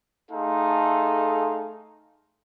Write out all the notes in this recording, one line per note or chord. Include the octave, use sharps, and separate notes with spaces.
A3 D#4 G#4 A4 F5 C6